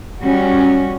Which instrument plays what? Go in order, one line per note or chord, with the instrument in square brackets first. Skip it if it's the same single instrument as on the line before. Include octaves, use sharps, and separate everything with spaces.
[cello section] G3 C#4 F#4